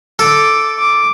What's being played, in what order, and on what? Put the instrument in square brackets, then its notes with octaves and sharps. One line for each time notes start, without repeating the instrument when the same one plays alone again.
[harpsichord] A4 [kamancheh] D6
[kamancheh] D6